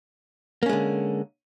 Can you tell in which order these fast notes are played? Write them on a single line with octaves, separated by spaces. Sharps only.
A#3 C#4 G#3 D3